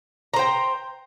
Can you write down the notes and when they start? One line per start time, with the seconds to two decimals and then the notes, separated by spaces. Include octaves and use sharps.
0.34 A#5
0.36 C5
0.39 G5